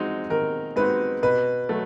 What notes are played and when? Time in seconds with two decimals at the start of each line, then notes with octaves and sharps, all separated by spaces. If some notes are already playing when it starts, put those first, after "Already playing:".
Already playing: G#3 C4 D#4 F#4
0.30 D#3 A#4
0.76 G#3 C4 D#4 F#4 B4
1.23 B2 B4
1.69 F#3 A3